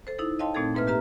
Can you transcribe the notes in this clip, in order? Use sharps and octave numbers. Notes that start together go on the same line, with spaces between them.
A4 C5
D#4 E4 A4
C#5 D#5 F5 G5 A5 C6
A#2 A3 C4 D#4 A4 G#6
G#2 A#3 B4 E5 F6
G4 B4 E5 A#5 F6